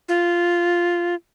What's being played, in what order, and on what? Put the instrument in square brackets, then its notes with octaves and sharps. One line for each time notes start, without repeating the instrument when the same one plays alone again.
[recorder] F4